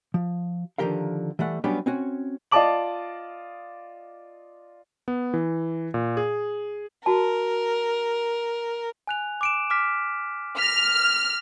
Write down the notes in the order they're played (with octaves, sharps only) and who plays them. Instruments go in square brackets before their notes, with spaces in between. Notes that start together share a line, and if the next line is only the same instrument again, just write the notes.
[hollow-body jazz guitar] F3
D3 D#3 F3 G4 A#4 F5
E3 G3 A3 F#5
F#3 G3 B3 C#4 D4 G4
C4 C#4 F#4
[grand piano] F4 D5 D#5 A5 D6 F#7
[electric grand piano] B3
E3
A#2
G#4
[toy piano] F#4 A5 [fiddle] A#4
[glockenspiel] G#5 F#6 F7
D6 D7 E7
D6 F6 B6
[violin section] F6 [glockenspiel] A#6 B6